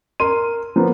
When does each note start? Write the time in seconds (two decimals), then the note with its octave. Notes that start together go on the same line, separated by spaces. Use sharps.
0.20 A#4 C6 D#7
0.76 F3 A#3 B3